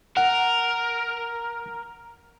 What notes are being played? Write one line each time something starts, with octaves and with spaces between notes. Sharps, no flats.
A#4 F#5